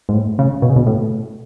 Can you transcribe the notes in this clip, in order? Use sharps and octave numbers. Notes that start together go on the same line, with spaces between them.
G#2
A2
C#3
B2
C#3
B2
A2